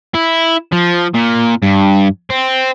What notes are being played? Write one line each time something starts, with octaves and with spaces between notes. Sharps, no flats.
E4
F3
A#2
G2
C4